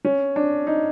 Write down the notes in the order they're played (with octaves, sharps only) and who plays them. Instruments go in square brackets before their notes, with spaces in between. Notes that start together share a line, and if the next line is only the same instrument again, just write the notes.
[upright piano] C#4
D4
D#4